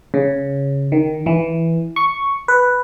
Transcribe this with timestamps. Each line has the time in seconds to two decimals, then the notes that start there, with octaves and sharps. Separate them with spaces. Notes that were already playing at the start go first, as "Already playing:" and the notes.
0.14 C#3
0.92 D#3
1.26 E3
1.96 C#6
2.48 B4